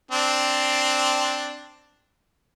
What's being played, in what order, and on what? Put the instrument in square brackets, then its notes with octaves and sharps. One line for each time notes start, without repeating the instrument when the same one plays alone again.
[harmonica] C4 D4